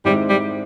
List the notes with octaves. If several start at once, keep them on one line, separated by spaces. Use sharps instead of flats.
G#2 D#3 G3 G#3 C4 E4
G3